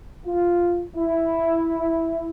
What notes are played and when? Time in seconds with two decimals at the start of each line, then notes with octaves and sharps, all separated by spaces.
0.25 F4
0.96 E4